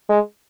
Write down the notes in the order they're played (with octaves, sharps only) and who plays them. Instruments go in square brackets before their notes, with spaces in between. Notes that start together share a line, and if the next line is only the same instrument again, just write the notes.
[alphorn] G#3